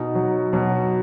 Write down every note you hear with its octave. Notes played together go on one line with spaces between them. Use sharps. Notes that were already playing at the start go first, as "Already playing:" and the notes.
Already playing: B2 D#4
F#3
B2 F#3